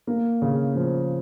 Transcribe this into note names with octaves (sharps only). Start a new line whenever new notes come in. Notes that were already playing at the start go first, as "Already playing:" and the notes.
A#3
C#3
F3